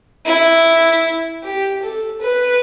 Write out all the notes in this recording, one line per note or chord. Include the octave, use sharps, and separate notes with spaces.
E4
G4
A4
B4